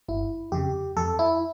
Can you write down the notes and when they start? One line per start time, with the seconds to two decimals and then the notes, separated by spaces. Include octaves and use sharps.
0.09 G1 E4
0.52 F2 C#3 G4
0.96 F2 A4
1.19 E4